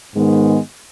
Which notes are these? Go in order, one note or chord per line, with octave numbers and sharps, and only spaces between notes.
G#2 D#3 G#3 B3